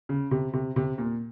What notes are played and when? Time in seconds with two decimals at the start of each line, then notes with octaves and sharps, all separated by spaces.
0.09 C#3
0.31 C3
0.53 C3
0.76 C3
0.98 A#2